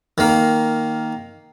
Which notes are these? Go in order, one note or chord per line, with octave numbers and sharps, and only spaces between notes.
D#3 A#3